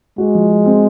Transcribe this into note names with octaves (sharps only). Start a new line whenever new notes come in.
G#3 F#4
F3
F#4
C4